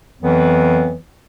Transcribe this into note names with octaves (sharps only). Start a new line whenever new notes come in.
F2 E3 F#3 B3